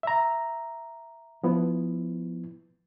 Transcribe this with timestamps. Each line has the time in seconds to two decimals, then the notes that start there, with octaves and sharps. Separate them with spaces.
0.03 E5 A#5
1.43 F3 B3 E4